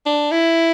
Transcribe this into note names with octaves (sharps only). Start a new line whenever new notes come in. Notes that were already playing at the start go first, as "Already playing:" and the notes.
D4
E4